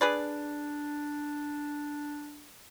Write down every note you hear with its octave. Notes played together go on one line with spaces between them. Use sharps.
D4 G#4 B4 D5